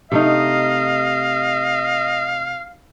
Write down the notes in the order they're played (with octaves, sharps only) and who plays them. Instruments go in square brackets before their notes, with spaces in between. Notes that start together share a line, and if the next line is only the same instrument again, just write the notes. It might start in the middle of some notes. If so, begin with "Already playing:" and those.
[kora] C3 A3 D#4 [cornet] D#5 [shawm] F5